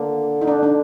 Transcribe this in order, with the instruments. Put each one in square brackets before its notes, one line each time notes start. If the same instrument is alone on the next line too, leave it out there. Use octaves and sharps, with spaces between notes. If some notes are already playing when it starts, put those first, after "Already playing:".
Already playing: [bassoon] D3 [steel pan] A#3
[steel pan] D#4
D4
D4